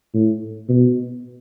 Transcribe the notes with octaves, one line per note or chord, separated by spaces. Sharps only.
A2
B2